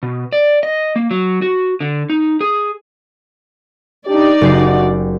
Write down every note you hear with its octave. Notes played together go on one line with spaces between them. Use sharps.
B2
D5
D#5
A#3
F#3
F#4
D3
D#4
G#4
D4 D#4 G4 D5
F#1 D3 A3 F#4 G4 C7